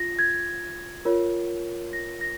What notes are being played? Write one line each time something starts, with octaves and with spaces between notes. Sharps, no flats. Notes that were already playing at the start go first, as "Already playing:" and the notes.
Already playing: F4 A#6
G#6
F4 A#4 C#5
A#6
A#6